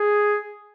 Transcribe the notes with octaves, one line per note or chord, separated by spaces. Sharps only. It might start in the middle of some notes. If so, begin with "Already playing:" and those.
Already playing: G#4